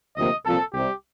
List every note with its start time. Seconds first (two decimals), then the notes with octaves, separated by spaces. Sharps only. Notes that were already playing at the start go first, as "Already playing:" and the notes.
0.17 D2 C3 F3 A#3 D#5
0.45 C2 A#2 F3 C4 A4
0.73 C2 C3 G3 G4